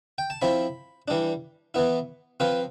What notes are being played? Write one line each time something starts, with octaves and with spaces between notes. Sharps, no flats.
G5
A5
F3 C4 E4 B5
E3 G3 D4
E3 B3 E4
F3 C4 F4 B4